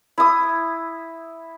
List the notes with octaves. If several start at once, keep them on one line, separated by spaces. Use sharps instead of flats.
E4 D#6